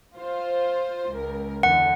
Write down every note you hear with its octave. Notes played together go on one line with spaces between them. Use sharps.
F4 C5
C#2 A#4
E2 D3 F#5